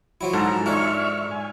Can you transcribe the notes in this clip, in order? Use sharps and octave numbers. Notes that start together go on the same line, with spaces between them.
F3 F#3 E4
G#2 A4 A5 A#5
D4 D#4 F4 A4 C#5 E5 C#6 F6
G#5